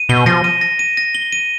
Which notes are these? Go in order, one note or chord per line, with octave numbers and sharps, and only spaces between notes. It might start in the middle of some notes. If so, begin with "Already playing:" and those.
Already playing: D#7
B2 G7
F3 A#6
D#7
A#6
D#7
A#6
G7
D#7